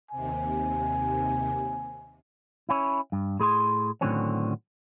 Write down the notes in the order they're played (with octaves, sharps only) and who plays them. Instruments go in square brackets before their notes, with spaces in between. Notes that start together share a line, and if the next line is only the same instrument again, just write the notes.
[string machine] D#2 C3 [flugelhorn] G#5
[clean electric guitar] C#4 E4
G2
A2 G#4 B5 C6
A2 D3 D#3 F#3 C4 C#4